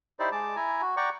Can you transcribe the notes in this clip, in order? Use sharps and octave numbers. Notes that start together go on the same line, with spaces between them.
D#4 E4 G4 C5 D5
G#3 A5 D6
E4 G#5 A#5
F#4
D5 F#5 G5 A#5 C#6 D6